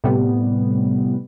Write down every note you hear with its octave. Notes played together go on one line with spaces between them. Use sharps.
A2 C3 G3 B3